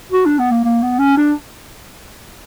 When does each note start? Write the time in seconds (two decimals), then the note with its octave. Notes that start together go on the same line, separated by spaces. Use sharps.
0.12 F#4
0.26 D4
0.39 B3
0.51 A#3
0.65 A#3
0.82 B3
0.99 C#4
1.17 D4